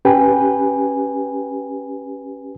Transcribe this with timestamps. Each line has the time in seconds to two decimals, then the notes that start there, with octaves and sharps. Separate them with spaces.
0.05 C#4 G4 B4 G5 G#5